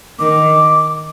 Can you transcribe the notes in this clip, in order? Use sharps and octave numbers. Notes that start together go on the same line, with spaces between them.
D#3 D6